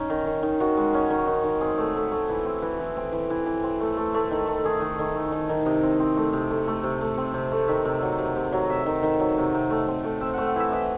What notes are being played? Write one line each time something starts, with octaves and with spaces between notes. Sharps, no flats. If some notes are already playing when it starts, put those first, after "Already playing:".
Already playing: C#4 D#4
D#3
D#3
D#3
D#3 F#4
G#3
C#4
D#3
D#3
D#3
C4 G#4
A3
A3
A3
E3
C4
E3
E3
C4
E3
E3
E3
C4
A3
A3
A3
D#3
A3
D#3 G#4
D#3
D#3
A3
D#3
D#3
C3 D#5
C4
C4
A3
C3
A3
A3
C3
A3
C4
C3
A3
D#3 E5
C3
F#3
C3
C3
F#3
C3 E5
D#3
D#3
F#3
C3
C3
A3
C4
A3
C4 E5
A3 F#5
F#5
E3 E5
E3 D#5